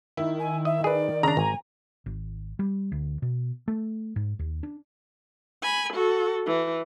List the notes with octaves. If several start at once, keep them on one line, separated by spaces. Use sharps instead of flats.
D#3 E4
G#5
D#5 E5
G#4 B4 D5
C#3 D4 A#5
G#1 G#5
G#1
G3
D2
B2
A3
G#2
D#2
D4
G#5 B5
F#4 A4
E3